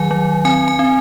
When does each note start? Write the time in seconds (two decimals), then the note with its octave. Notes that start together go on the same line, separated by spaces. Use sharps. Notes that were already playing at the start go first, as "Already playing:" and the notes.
Already playing: D#3 F#3 G#5
0.11 F#3
0.45 C4 G#5
0.68 G#5
0.79 C4